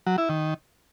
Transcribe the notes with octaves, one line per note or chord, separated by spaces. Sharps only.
F#3
E4
D#3